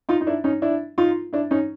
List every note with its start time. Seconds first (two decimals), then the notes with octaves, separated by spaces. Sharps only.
0.09 D#4 F4
0.21 D#4
0.27 D4 E4
0.44 C#4 D#4
0.62 D4 E4
0.98 D#4 F4
1.33 D4 E4
1.51 C#4 D#4